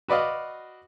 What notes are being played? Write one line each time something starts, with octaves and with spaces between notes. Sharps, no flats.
F#4 B4 D5 D#5 F5